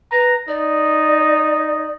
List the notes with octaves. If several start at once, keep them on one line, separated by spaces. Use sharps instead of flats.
B4 A#5
D#4 D5